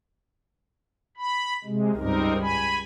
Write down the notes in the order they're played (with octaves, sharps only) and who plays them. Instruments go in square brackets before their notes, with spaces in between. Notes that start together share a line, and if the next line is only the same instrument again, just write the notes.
[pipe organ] B5
C3 G#3
[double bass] C#2 G2 [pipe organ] C4 D#4 A#4
[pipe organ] G#5 B5